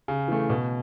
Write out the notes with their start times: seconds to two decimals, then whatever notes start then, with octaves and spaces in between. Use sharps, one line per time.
0.08 C#3
0.28 E3 A3
0.49 B2